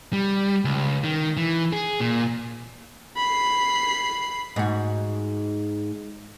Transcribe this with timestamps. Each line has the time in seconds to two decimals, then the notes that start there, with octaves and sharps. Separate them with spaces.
0.13 G3
0.65 C#2
1.04 D#3
1.37 E3
1.73 G#4
2.00 A#2
3.17 B5 C7
4.56 G#2 F#4